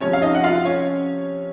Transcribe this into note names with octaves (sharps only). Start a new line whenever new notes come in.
C3 F3 C#4 C#5
F5
D#4 D#5
F#5
F4 F5
C#4 C#5